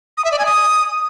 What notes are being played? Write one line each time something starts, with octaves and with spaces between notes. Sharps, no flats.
D#6
E5
D5
G#5
D#6